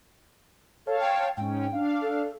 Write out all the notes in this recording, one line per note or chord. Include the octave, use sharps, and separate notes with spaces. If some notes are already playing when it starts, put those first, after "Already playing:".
A4 C#5 F5 A5
G5
G#2 C#4 G5
D4 F5
A4